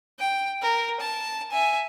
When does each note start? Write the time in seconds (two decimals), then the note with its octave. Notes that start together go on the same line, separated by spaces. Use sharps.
0.20 G5
0.62 A#4
1.00 A5
1.51 E5 G#5